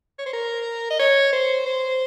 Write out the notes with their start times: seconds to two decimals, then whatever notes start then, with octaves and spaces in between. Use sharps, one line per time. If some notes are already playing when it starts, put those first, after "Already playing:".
0.19 C#5
0.26 C5
0.33 A#4
0.90 D#5
0.99 C#5
1.32 C5
1.66 C5